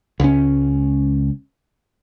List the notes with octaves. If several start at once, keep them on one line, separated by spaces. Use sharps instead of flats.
C#2 C#4